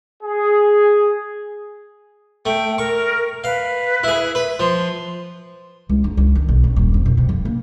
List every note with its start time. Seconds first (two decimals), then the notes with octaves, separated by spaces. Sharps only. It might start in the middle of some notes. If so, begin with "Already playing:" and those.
0.23 G#4
2.46 A3 G5
2.78 A#4 C#6
3.44 B4 F5
4.03 E4 G#4
4.35 B4
4.60 F3 C6
5.89 C#2
6.04 D#4
6.17 C#2
6.36 D#3
6.49 B1
6.64 C#3
6.76 D#1
6.94 F2
7.06 B2
7.17 C3
7.29 F3
7.45 A#3